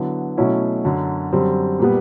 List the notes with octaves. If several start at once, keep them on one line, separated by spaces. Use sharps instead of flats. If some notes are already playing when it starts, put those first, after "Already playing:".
Already playing: D3 F#3 B3 E4
B2 F#3 A3 C#4 E4
F#2 D3 F#3
F#2 D3 G3 C4
A#2 G3 B3